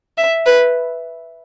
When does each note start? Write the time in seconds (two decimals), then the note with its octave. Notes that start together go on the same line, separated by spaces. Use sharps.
0.18 E5
0.46 B4